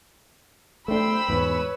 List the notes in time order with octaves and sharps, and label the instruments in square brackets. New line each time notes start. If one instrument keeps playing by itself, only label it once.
[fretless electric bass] A3 D4 [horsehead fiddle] C5 G5 [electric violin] B5 E6
[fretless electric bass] E2 G#2 [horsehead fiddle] B4 C#5